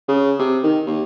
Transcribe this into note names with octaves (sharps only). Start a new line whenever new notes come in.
C#3
C3
D#3
D#2